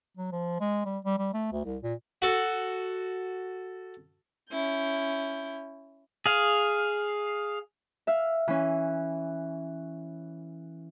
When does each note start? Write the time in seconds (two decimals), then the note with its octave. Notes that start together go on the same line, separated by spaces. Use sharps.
0.17 F#3
0.32 F3
0.60 G#3
0.85 G3
1.05 G3
1.19 G3
1.34 A3
1.52 D2
1.65 C2
1.83 A#2
2.22 F#4 A4
4.50 C#4 E4 G6
6.26 G#4 F5
8.07 E5 F5
8.48 E3 C#4